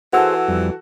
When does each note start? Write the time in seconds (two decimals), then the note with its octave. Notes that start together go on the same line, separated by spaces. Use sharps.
0.13 E3 F#4 G#4 A4 C5 F#5 E6
0.48 F2 G3